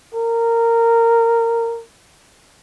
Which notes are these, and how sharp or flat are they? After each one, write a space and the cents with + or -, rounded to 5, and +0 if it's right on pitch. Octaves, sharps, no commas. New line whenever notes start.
A#4 -15